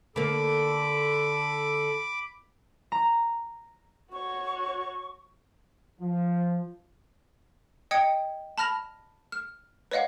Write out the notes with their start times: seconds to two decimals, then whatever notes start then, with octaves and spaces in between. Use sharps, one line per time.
0.16 D3 A#3 A4 B5 D6
2.92 A#5
4.13 F#4 C#5 C#6
6.01 F3
7.91 D#5 G5 D#6 G#6 C#7
8.58 A5 B5 F6 A#6 F7
9.32 F6
9.91 B4 C#5 D#5 F5 F#5